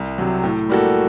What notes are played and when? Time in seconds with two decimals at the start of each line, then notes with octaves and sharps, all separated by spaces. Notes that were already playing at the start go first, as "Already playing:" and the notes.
Already playing: C2
0.18 C3 F#3
0.43 A2
0.69 G3 A#3 F#4 A4